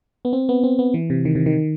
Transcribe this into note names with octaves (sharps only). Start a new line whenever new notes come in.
B3
C4
B3
C4
B3
E3
C3
D#3
C3
D#3